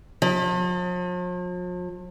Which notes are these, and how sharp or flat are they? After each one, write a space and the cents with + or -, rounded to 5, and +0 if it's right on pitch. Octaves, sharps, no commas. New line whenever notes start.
F3 +45